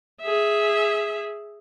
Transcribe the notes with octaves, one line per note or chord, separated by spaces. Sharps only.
G#4 E5